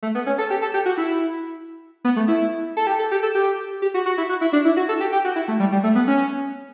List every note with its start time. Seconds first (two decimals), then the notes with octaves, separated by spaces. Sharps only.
0.02 A3
0.15 B3
0.26 C#4
0.38 A4
0.50 G4
0.62 A4
0.74 G4
0.85 F#4
0.97 E4
2.05 B3
2.16 A3
2.28 E4
2.77 A4
2.87 G4
2.99 A4
3.11 G4
3.23 A4
3.35 G4
3.82 G4
3.94 F#4
4.06 F#4
4.18 E4
4.29 F#4
4.41 E4
4.53 D4
4.65 E4
4.77 F#4
4.89 A4
5.01 G4
5.13 G4
5.25 F#4
5.36 E4
5.48 A3
5.60 G3
5.72 G3
5.84 A3
5.95 B3
6.07 C#4